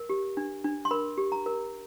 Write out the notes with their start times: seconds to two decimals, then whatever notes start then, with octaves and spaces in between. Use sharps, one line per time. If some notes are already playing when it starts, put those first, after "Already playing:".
Already playing: A#4
0.10 G4
0.37 D4
0.64 D4
0.85 C6
0.91 A#4 B5
1.18 G4
1.32 A#5
1.46 A#4